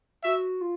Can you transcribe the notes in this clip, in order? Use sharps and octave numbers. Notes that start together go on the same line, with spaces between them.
F#4 E5
F4